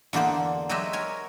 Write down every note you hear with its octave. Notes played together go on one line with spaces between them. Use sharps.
E2 D3 A#3 C5 D5
F#3 G#3 F#4 G4 D#5 E5
A#4 C#5 G#5